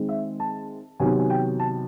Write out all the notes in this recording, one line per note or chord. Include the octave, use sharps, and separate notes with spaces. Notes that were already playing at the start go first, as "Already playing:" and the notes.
Already playing: D#3 G#3 C4
E5
A5
C3 D#3 F#3 B3 G#5
G#5
G5
A5